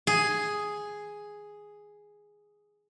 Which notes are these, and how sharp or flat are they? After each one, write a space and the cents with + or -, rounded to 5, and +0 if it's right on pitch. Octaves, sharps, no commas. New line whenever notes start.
G#4 +0